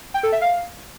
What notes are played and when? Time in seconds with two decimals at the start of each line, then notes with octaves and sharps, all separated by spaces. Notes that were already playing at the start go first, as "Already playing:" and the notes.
0.14 G5
0.23 A4
0.32 E5
0.41 F5